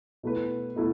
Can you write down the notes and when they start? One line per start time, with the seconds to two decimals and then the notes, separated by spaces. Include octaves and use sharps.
0.23 B2 A3 E4 B4
0.76 B2 A3 E4